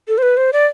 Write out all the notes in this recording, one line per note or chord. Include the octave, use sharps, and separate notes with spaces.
A4
C5
B4
C5
D5